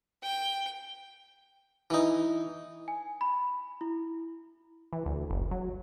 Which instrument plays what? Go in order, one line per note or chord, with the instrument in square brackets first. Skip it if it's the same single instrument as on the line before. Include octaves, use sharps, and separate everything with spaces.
[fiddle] G5
[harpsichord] E3 D#4
[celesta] G#5
B5
E4
[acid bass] E3
D2
F#1
F#3